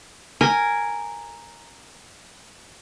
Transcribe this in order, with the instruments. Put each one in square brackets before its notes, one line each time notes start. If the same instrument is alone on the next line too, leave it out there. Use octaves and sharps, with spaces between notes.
[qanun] A#4 G#5